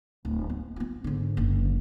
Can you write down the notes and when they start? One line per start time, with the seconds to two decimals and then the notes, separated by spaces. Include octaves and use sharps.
0.25 D1
0.49 B3
0.76 B3 F4
1.04 G#2 D3
1.37 F#1 D3